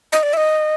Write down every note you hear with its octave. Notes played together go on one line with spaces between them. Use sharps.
D#5
D5
E5
D#5